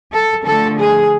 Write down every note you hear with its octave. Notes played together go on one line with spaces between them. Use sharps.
A4
D3 F3 A3 A4
G#4